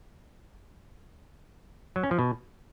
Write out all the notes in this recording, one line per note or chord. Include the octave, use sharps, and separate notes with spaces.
F#3
C#4
F3
B2